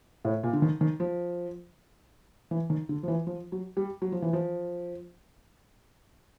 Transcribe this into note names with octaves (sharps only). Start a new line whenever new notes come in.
A2
A#2
D3
D#3
D#3
F3
E3
D#3
D3
F3
E3
F3
F#3
G3
F#3
F3
E3
F3